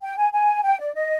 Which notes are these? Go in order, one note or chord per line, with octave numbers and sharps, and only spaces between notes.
G5
G#5
G#5
G5
D5
D#5